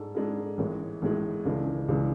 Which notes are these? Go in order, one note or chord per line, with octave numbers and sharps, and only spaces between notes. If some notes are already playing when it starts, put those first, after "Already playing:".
Already playing: G#2 G#3 D4 A4
G#2 G#3 D4 A4
A1 A2 G#3
A1 A2 G#3
C#2 C#3 E3 G#3 D4
C#2 C#3 E3 G#3 D4